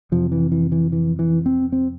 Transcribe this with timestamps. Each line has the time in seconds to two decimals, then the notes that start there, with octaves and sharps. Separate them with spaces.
0.12 F2 C3 F3
0.32 E3
0.52 E3
0.72 E3
0.92 E3
1.19 E3
1.46 C4
1.72 C4